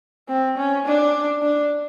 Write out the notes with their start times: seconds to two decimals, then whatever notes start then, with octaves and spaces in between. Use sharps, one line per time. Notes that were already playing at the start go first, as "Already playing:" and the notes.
0.28 C4
0.57 C#4
0.86 D4
1.42 D4